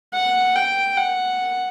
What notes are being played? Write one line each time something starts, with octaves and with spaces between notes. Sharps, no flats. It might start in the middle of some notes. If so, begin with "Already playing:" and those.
F#5
G5
F#5